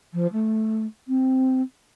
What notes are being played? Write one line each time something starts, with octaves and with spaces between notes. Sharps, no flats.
F3
A3
C4